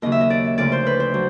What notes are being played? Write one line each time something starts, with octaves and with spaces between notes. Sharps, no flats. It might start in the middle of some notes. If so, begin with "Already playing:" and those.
D#2 C#3 F#3 D#5
E5
D#5
D5
D2 C#3 F3 D5
C5
B4
C5
F#3